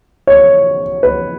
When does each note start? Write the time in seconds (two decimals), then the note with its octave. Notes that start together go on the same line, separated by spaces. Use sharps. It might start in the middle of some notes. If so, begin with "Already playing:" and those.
0.27 C#5
1.03 B4